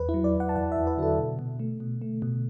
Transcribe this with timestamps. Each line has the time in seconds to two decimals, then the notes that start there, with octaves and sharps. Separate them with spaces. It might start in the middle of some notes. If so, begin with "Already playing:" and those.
Already playing: E2 B4
0.09 E4
0.14 F#3
0.24 D5
0.35 E2
0.40 F#5
0.49 A5
0.56 E2 F#5
0.72 E2 E5
0.87 B4
0.97 D3 F#4
1.03 A4
1.18 B2
1.39 B2
1.60 A3
1.80 B2
2.01 A3
2.22 B2